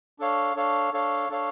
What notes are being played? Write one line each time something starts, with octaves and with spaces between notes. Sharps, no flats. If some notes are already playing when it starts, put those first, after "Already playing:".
D4 A4 C#5 F5
D4 A4 C#5 F5
D4 A4 C#5 F5
D4 A4 C#5 F5